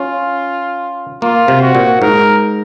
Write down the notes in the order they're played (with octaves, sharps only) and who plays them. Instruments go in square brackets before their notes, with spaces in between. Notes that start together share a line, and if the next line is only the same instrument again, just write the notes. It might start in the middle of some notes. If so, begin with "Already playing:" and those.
Already playing: [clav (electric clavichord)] C#4 [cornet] F4
[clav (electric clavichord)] A#3 [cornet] F4
[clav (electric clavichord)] C3
[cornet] F#4
[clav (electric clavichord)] A#2
[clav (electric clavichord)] G#2 [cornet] A#4